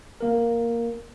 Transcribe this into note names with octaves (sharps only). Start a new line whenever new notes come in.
A#3 A#4